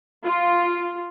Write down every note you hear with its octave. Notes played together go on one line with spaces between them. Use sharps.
F4